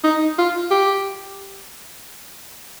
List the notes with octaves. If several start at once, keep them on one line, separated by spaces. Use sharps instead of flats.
D#4
F4
G4